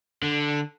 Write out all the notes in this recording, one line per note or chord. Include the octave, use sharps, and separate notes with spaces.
D3